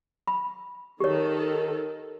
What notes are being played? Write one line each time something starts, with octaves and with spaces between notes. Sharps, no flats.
B5
D#3 G4 A4 C#5